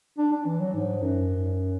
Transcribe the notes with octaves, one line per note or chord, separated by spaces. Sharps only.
D4
D4
E3
F#3
G#2
F#2